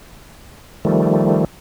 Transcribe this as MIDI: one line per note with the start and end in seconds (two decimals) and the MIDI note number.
0.85 1.45 51
0.85 1.45 53
0.85 1.45 55
0.85 1.45 57